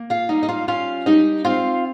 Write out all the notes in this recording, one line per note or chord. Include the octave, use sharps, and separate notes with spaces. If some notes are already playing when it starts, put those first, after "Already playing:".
Already playing: A#3
F4 F5
G3 D#4 D#5
D#5
F4 F5
C#4 F4 F5
G3 D#4 D#5
C4 F4 F5